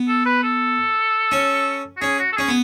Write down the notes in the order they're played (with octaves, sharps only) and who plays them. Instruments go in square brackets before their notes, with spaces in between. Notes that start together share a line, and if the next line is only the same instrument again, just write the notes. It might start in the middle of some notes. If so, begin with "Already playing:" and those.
Already playing: [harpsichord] B3
[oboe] A4
B4
A4
[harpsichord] C#4
[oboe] F#4
[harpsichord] C#4 [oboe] G#4
[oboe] F#4
A4
[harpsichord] C#4 [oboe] G#4
[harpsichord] B3